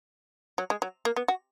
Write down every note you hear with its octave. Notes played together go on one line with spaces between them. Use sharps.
F#3
G#3
F#3
A#3
B3
F#4